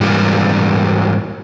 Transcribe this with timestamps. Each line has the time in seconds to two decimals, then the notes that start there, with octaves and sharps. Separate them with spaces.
0.01 G#2 E3 G3 A#3